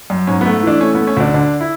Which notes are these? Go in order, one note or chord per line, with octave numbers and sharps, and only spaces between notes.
F#2
G#2 C#4
B3
A3
E3 D4
A3 C#4
A3 B3
C#4
D2 D4
D3 D4
E4